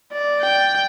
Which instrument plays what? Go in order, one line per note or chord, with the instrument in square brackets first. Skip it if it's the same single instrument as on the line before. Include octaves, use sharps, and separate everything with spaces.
[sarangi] D5
[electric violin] G5